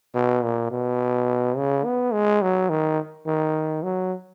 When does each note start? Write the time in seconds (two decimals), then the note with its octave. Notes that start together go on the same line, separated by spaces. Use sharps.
0.14 B2
0.43 A#2
0.71 B2
1.57 C#3
1.84 B3
2.13 G#3
2.42 F#3
2.69 D#3
3.26 D#3
3.83 F#3